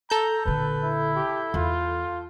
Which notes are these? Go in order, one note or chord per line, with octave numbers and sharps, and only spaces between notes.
A4 A#5 G6
A#1 D3 B4
E4
G4
E2 F4